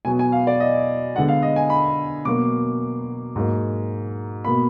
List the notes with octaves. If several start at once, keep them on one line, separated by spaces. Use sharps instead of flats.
B2 F#3 B3 G#5
G#5
F5
D5
D#5
D3 G#3 B3 F#5
F5
D#5
G#5
B5
B2 F#3 A#3 D6
G#2 F#3 A#3
B2 A#3 B5